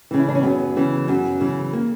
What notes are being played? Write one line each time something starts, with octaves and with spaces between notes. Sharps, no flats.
C#3 E3
E4
D4
C#4
F#2 B3
C#3 E3
F#2
C#3 E3
A#3